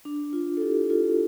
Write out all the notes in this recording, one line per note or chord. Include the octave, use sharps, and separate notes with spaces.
D4
F4
A4
E4 G4
F4 A4